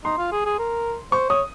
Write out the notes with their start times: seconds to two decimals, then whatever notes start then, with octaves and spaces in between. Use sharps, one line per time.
0.04 D#4 C6
0.18 F4
0.32 G#4
0.45 G#4
0.59 A#4
1.12 C5 C#6
1.29 C#5 D#6